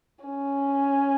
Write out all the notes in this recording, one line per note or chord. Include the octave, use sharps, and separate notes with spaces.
C#4